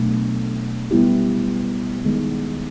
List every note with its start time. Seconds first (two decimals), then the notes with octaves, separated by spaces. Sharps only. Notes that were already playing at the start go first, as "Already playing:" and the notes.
Already playing: B2 F#3 A3 D4
0.91 G3 B3 E4 G4
2.04 D#3 G#3 B3